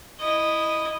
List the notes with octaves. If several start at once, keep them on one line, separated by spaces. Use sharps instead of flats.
E4 D#5